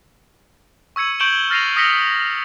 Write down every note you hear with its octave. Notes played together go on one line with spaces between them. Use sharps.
C#6 E6 G#6 C#7 D#7
C#6 G6 D7 E7 F#7 G7
G7
F6 A6 A#6 C7 D#7 F7
D#6 E6 A#6 B6 C#7 G7
B6